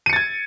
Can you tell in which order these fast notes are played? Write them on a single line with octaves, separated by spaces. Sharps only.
D#7 C#7 A6 G#6